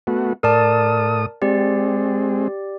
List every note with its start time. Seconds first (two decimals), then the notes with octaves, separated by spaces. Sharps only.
0.07 A3 B3 F#4
0.43 A2 A#4 D5 A5 D#6
1.42 G#3 C4 G4 D5